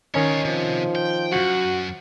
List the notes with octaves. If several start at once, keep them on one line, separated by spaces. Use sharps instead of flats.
D#3 C#4 D#4 F4 C#5
C3 F3
G5
F#2 F#4